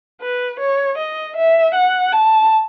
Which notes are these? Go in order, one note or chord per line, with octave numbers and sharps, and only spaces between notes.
B4
C#5
D#5
E5
F#5
A5